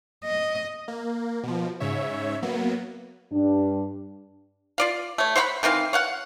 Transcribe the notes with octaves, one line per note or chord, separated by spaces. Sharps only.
D#5
A#3
B2 F3
G#2 C#3 C#5 E5
F#3 A#3 B3
G2 D4
F4 D5 F5
A3 C#5
C5 C#5 F#5 B5
D#3 E3 C4 F5
C#5 F5 F#5